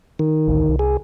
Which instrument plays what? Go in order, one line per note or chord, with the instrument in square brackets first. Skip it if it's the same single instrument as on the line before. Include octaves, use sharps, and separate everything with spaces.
[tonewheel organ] D#3
[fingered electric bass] A1 D2
C2
[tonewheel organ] G#4